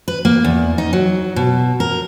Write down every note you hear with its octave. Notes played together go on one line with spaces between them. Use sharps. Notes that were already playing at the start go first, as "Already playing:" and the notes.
B4
A#3
E2
D#4
F#3
B2
A#4